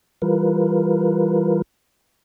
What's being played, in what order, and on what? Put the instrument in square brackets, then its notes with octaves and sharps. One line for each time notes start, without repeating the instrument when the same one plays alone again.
[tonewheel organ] E3 G3 F4 A#4 B4